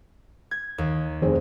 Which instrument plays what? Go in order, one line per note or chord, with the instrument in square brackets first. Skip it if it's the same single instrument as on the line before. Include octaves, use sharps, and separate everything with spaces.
[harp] G#6
D#2
[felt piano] F1 C4 G#4